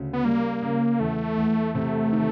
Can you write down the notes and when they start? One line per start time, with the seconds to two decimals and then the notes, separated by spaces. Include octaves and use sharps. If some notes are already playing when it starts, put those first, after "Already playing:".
Already playing: D2 C#3
0.13 B3
0.25 G3 A#3
0.62 C#3
1.00 E2 A3
1.37 E2
1.75 C3 A3
2.12 D#3